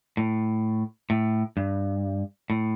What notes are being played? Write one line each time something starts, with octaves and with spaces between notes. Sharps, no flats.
A2
A2
G2
A2